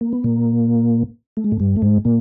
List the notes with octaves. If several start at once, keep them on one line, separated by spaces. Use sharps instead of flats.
A#3
B3
A#2 A#3
A3
G#3
A2 A3
G2 G3
A3
G#2 G#3
A#2 A#3